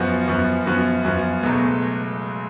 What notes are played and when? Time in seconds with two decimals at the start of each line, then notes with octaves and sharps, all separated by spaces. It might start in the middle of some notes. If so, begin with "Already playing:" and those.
Already playing: F#2 F3 B3 F#4
0.27 F#2 F3 B3 F#4
0.66 F#2 F3 B3 F#4
1.05 F#2 F3 B3 F#4
1.43 C#2 B2 F#3 A3